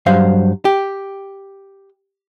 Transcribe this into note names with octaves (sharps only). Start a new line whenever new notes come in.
G2 F#3 C5 F5
G4